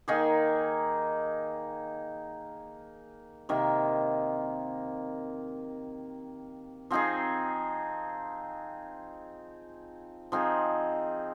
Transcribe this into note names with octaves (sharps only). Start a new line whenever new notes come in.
D#3 A#3 D#4 G#4
C3 D#3 A#3
F3 C4 D#4 G#4
F3 C4 D#4 G#4